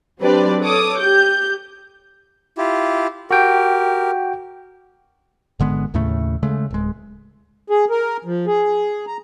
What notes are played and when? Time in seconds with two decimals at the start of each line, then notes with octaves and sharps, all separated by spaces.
0.20 F#3 C4 D4 G4 B4 D5
0.61 A4 C#5 D6 D#6
0.99 G4 G6
2.58 E4 F4 G4
3.31 F#4 G4 A#4 G5
5.59 G#1 D3 G#3 B3
5.94 D#2 A2 C#3 A3
6.43 C#3 G#3 A3
6.71 D1 G#3
7.70 G#4
7.90 A#4
8.25 F3
8.47 G#4
9.07 A#5